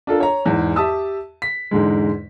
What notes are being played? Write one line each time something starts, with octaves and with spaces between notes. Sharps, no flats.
D4 F4 A4 A#4
C#5 A#5
E2 G#2
G4 E5 A5 D#6 E6
B6
E2 G#2 D3 G#3